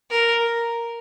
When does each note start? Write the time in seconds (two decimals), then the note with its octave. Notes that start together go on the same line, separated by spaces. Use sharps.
0.10 A#4